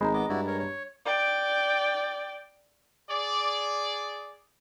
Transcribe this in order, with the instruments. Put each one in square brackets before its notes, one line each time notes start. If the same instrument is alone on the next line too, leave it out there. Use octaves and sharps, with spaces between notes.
[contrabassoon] G#1 [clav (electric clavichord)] G#3 [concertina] C5 [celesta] A#5 B5
[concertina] B3 D#5 D6
[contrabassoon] G2 [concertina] E4 F#4 D5
[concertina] A#4 C#5
C#5
[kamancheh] D5 G5
[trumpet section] G#4 D5